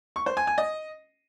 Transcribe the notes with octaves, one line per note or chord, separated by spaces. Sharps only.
C#6
C5
G#5
G#5
D#5